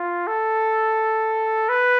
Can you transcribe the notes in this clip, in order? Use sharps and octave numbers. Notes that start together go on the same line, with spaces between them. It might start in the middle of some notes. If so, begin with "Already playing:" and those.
Already playing: F4
A4
B4